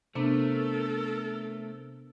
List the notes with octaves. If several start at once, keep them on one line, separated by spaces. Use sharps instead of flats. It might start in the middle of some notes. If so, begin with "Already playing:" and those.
C3 A3 B3 D4 A4 A#4